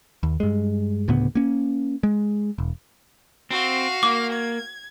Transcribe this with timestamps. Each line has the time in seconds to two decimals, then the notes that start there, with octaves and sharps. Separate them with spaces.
0.23 D#2
0.40 G2 G#3
1.08 D2 A2 C#3 B3
1.35 A#3 C#4
2.03 G#3
2.58 E1
3.51 C4 F#4 F5
4.03 A#3 D6
4.32 G#6